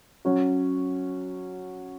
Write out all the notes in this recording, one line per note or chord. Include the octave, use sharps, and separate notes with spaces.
F#3 C#4 F#4